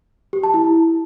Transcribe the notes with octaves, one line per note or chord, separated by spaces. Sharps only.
G4
A5
E4